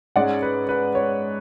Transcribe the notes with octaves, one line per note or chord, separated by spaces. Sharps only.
G#2 G#3 C#4 D5 F#5
B4
B4
C#5